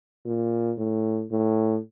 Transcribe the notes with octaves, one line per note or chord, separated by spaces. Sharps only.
A#2
A2
A2